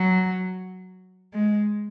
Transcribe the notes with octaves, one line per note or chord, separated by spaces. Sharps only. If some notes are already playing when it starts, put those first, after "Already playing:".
Already playing: F#3
G#3